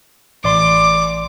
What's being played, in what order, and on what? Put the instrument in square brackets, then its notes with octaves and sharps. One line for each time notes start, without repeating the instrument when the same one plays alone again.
[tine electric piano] A1 D5 C6 [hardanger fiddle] D6